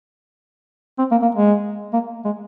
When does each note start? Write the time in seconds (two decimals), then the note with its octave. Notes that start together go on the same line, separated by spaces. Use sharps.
0.99 C4
1.11 A#3
1.22 A#3
1.35 G#3
1.93 A#3
2.25 G#3